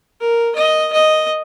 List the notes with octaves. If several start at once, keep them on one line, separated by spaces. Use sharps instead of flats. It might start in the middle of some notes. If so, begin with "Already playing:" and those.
A#4
D#5
D#5